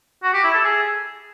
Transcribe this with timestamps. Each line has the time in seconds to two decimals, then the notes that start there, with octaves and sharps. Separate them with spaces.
0.23 F#4
0.34 G4
0.44 E4
0.54 A4
0.65 G#4